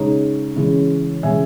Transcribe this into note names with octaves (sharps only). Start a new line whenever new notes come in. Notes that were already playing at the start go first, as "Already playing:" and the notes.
Already playing: C#3 G#3 D#4 C#5
C#3 E3 G#3 C#4
C#3 E3 G#3 C#4 E5 G#5